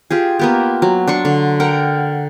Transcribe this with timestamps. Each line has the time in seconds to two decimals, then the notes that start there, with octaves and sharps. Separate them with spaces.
0.10 F4 G4 G#4
0.39 A#3 B3 G4
0.82 F#3
1.07 D4 C6 C#6
1.25 D3
1.60 A#4 F#5 G5